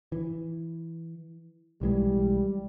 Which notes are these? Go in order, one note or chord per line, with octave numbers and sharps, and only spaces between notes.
E3
B1 E3 G3 G#3